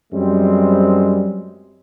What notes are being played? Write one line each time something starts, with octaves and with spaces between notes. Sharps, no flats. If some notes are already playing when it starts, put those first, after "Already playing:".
F#2 G3 G#3 C4